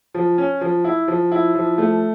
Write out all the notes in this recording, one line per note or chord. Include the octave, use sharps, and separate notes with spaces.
F3
C#4
F3
E4
F3
E4
F3
A3